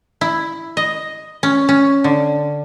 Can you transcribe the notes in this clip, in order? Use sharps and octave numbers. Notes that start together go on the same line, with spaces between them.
E4
D#5
C#4
C#4
D3